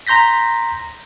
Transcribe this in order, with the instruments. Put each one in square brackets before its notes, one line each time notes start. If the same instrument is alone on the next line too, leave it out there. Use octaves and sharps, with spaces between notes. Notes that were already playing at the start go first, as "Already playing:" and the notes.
[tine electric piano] A#5 C6 G6 A#6 B6